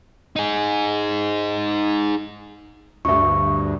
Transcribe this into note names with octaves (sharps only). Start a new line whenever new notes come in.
D#4 G#4
D2 G2 E5 C#6